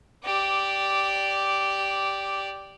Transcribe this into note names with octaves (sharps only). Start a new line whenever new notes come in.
G4 D5